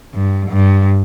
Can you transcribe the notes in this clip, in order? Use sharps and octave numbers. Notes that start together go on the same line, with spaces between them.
G2
G2